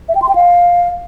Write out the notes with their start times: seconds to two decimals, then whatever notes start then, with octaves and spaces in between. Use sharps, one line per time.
0.09 E5
0.15 G5
0.22 C6
0.29 G5
0.35 F5